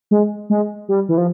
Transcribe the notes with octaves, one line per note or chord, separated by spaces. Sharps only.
G#3
G#3
G3
E3
F3